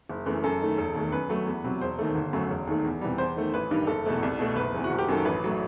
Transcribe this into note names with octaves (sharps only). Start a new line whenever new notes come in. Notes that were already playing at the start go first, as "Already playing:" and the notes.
F#1
F#2 E3 A3
F#2 A4
D#3 A3
E1 A4
D#2 D#3 A3
F#2 B4
F#3 A3
E2
C3 F#3
E1 C5
D#2 D#3 A3
G1
F#2 F#3 A3
E1
D#2 D#3 A3
E2
C3 E3 G3
E2 C5
D#3 A3
A1 B4
G2 D#3 G3
F#1 A4
E2 B2 A3
C2
B2 A3
F#1 B4
E2 C3 E3
F#4
F#1
G4
F#2 D#3 F#3 A4
A1 B4
F#3 A3